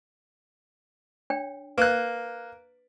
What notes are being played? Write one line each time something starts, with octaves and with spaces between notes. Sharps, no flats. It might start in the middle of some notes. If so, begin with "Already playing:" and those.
D4 C#5 G5
A#3 B4 F#6